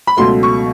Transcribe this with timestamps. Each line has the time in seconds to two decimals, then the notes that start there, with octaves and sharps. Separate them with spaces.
0.07 B5
0.17 C#2 B2 F#3 A3 C6
0.43 C#6